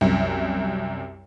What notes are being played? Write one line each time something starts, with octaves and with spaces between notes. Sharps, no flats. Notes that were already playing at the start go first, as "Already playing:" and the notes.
C2 F#2